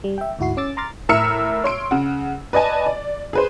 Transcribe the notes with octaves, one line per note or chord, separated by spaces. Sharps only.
G3
E5 G5
D2 G#2 E4 F#4 C7
C#4 D6 E6 A6
A#5 C6 D6 F6 A6
A2 A#4 E5 E6 F6 C#7
C#5 C6 D7
C#3 F#5
B4 D5 D#5 G#5 A5
D5
G#4 B4 C5